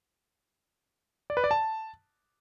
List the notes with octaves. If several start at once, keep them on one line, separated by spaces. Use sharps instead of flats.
D5
B4
D5
A5